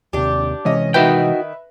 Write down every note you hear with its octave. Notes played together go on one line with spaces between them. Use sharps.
D#2 C3 D4 G4
C3 E3 G#3 C#4 D#5
D#3 D#4 F#4 B4 E5 G5